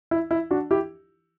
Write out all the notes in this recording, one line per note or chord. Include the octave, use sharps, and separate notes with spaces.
E4
E4
D4 F#4
E4 G4